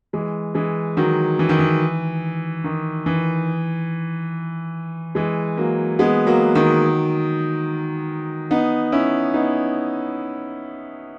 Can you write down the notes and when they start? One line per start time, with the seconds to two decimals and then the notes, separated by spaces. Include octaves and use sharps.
0.13 E3 G#3
0.55 E3 G#3
0.97 D#3 F#3
1.39 E3
1.49 D#3
1.59 E3
2.64 D#3
3.06 E3
5.15 E3 G#3
5.57 F#3 A#3
5.99 G#3 B3
6.27 F#3 A#3
6.55 D#3 F#3
8.51 B3 D#4
8.92 C#4 E4
9.34 B3 D#4